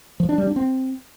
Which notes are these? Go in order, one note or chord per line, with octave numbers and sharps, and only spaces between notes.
F3
D4
G3
D4
C4